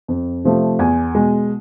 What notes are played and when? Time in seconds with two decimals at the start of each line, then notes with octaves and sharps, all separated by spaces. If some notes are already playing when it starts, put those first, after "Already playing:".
0.08 F2
0.44 C3 F3 A3
0.79 E2 G#5
1.15 B2 G#3